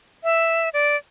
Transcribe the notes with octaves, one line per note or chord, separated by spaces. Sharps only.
E5
D5